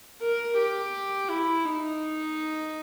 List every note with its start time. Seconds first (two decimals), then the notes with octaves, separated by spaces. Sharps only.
0.22 A#4
0.57 G4
1.29 E4
1.65 D#4